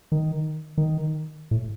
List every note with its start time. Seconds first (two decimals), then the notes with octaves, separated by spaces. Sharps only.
0.12 D#3
0.78 D#3
1.51 A2